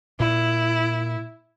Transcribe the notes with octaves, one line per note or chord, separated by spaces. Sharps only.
A#2 E4